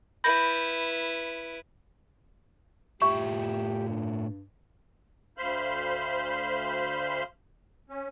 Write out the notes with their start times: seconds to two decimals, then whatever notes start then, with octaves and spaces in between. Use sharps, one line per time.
0.24 E4 B4 B5 G6 A#6
3.02 A2 F4 G4 E5 C#6
3.89 G2
5.38 D2 C5 F5 B5 G6
7.90 C#4